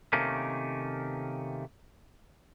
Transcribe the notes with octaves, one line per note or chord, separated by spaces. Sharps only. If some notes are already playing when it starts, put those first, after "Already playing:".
C3 D#3 A3 A#3 C#4